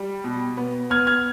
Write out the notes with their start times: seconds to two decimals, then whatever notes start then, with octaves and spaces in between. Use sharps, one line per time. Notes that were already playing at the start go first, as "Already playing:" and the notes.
Already playing: G3
0.24 B2
0.57 B3
0.90 B3 F6 G#6
1.07 F6 G#6